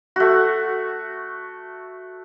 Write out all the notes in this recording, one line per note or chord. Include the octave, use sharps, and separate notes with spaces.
A3 F#4